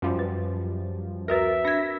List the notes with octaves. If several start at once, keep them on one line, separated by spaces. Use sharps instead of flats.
F#2 F3 G3
B4
D2 F#4 A#4 B4 E5
D4 G#6 A#6 B6